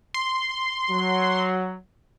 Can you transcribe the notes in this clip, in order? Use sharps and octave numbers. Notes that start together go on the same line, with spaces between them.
C6
F#3